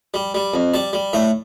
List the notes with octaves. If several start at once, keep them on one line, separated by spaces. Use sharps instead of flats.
G3
G3
F2
G3 A5
G3
A2 E5